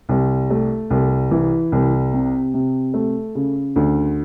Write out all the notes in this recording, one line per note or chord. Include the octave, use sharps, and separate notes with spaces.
C2
A3
C2
E3
C2
C3
C3
A3
C#3
D2